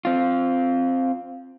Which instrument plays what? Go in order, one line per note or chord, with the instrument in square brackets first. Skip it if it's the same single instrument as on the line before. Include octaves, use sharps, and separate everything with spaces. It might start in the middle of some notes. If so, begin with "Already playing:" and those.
[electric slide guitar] C4 F4